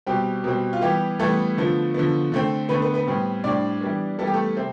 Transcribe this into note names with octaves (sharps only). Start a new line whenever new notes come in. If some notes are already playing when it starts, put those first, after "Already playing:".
B2 G3 C4 G4
B2 G3 C4
F4
E3 G3 B3 G4
E3 G3 A3 B3 A4
D3 F3 B3
D3 F3 B3
D3 A3 C4
D3 A3 B3 C4 B4
B3 B4
B3 B4
A2 G3 C4
A2 G3 C4 D4 D5
E3 G3 B3
E3 G3 B3 A4
G4
A3 A4
C3 C4